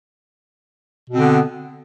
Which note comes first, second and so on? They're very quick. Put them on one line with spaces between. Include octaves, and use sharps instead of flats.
B2 C4 D3 B3